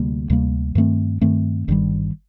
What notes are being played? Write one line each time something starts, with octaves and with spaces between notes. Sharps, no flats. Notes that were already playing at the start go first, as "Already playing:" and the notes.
Already playing: D2 C3 G3 A#3
D2 C3 G3 A#3
G2 D#3 A3 C4
G2 D#3 A3 C4
G1 G2 D#3 G3